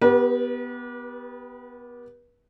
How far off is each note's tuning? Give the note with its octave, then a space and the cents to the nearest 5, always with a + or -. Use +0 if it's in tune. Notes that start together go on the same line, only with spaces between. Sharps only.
B3 +0 G4 +0 B4 -40